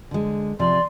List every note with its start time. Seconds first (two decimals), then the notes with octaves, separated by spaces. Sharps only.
0.11 D3 G#3
0.59 C3 F3 D5 C6